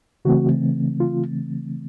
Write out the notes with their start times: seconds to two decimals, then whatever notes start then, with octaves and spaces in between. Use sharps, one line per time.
0.25 C#3 E3 A3 C4 F#4
1.00 F4